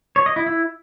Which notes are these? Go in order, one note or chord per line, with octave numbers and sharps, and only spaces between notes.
C#5
D#5
E4
E4